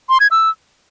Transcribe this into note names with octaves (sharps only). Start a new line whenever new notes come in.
C6
G#6
E6